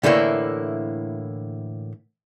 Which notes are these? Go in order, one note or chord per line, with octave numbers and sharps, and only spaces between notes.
A2 D3 E3 A3 A#3 E4